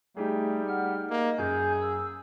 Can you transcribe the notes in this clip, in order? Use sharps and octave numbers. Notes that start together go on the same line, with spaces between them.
G3 A3 D#4 G4 G#4
F#5 F6
A#3 D#5
F#2 G#4 G#5 G6
E6